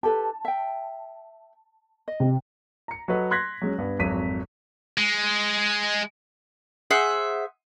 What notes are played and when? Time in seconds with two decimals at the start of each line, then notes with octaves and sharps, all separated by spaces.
0.03 G4 A4 B4 A5
0.45 E5 G5
2.08 D#5
2.20 C3
2.88 A#5 C#7
3.08 F#3 F#4 A4 B4 D#5
3.31 C6 F#6 G#6 A#6 B6
3.62 F#3 G#3 C#4
3.78 G2 B3
3.99 G#1 F2 F#3 B6 D#7
4.98 G#3
6.91 G#4 C5 E5 F#5